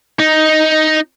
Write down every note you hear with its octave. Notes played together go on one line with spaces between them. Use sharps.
D#4